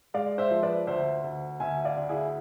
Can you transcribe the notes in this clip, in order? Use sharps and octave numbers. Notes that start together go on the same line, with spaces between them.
G#3 D5 F5
C5 E5
F3
B4 D5
D2 C5 E5
D2
D2 E5 G#5
D5 F5
D2
E4 G#4